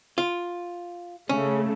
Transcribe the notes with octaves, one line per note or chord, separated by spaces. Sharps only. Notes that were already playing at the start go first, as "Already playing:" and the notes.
F4
C#3 A3 C#4